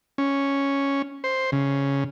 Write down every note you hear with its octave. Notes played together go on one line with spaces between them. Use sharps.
C#4
C5
C#3